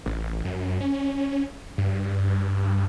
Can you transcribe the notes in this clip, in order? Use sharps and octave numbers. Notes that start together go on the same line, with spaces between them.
A1
F#2
C#4
G2